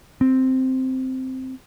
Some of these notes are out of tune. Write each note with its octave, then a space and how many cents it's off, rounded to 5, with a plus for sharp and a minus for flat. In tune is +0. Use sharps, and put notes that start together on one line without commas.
C4 -5